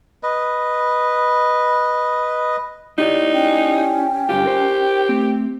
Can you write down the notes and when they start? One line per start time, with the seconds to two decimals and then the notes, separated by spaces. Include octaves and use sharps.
0.23 B4 D#5
2.98 D#4 E4 G4 D5
3.33 C#4 G5
4.29 G2 D3 F4 G4
4.45 A#4 C5
5.09 A3 C4